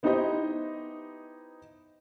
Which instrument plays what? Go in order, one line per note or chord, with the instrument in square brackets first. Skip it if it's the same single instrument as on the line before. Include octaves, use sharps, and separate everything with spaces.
[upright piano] B3 D#4 E4 G4 C5 D#5